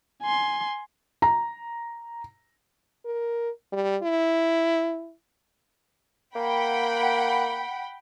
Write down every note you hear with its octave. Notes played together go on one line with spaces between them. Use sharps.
G#5 C6
A#5
A#4
G3
E4
A#3 F#5 G5 B5